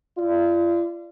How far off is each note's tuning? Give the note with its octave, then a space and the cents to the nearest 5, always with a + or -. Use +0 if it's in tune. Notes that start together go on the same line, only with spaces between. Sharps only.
F4 -40 D5 +0